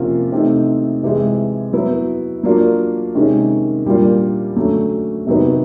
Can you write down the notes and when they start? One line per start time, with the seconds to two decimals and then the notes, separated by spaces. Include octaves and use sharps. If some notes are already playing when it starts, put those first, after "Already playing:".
Already playing: C3 F3 A#3 C#4 F4
0.32 C3 E3 A3 C4 D#4
1.03 C3 E3 G#3
1.73 F#3 B3 E4
2.43 F#3 A#3 D4 F4
3.15 C3 D#3 G#3 C#4
3.85 A#2 G3 A#3 D4 F4
4.56 D3 F#3 A3 C#4
5.27 C3 D#3 F#3 B3